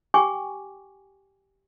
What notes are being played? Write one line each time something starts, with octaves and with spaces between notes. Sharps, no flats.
G4 G5 G#5 C#6 D6